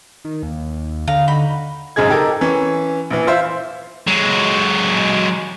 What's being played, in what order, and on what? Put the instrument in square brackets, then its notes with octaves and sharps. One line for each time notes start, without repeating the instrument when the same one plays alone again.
[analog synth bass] D#3
D#2
[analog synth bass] D3 [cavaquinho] F5 A#5
[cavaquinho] D#4 F#4 B5
[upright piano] G#1 F#2 C#3 D#4 G#4 G#6
D#4 G4 A4 A#4
E3 C#4
A#1 E3
F4 C5 E5
[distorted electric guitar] F#3 G#3